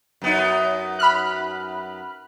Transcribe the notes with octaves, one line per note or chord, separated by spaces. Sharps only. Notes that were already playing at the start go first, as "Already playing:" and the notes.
F#2 B3 D#4
B5 F6 F#6